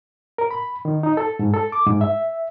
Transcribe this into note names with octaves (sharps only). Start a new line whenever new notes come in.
A#4
B5
D#3
D#4
A4
G#2
A4
D6
G#2
E5